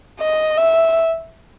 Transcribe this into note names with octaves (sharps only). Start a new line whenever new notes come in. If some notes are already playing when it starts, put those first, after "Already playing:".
D#5
E5